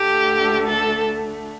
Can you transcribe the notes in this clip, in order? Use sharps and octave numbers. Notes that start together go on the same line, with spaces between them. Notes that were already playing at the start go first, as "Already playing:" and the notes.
Already playing: D2 D3 A3 G4
A4